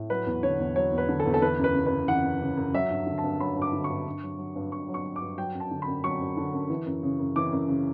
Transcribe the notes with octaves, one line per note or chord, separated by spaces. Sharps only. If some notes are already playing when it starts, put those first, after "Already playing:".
Already playing: A2
F#3 B4
E2
D3 C#5
E2
F#3 C#5
E2
B4
D3
A4
E2
A4
E3 B4
F#2 B4
C#3
B4
F#2
E3 F#5
F#2
C#3
F#2
F#3 E5
G2
D3
A5
G2
F#3 B5
G2
D6
D3
C#6
G2
G2
F#3
F#3
G2
G2 C#6
F#3
C#6
F#3
D6
G2
F#3 G5
F#2
A5
D3
B5
F#2
F#3 C#6
F#2
D3
F#2
E3
F#2
C#3
F#2
E3 D6
F#2
C#3